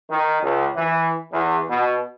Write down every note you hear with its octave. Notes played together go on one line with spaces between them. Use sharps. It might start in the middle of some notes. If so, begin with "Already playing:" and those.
D#3
C#2
E3
E2
B2